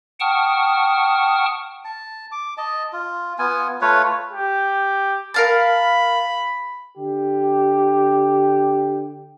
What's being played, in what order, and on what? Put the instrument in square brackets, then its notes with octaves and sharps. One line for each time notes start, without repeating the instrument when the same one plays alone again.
[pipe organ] F#5 G5 A5 C#6 D#6 F6
[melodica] A5
D6
D#5 A5
F4
B3 F4 G#5
A3 F4 B4 C#5
[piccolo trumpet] G4
[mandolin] A#4 F5 A5 [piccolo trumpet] B5
[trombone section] D3 G4